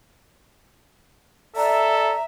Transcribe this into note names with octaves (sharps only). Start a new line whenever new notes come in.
A4 D5 E5 A#5